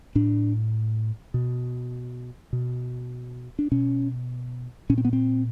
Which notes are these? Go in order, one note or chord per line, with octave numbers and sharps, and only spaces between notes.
A2 D4
B2
B2
D4
B2 C#4
A#2 C#4
C4
B3
C4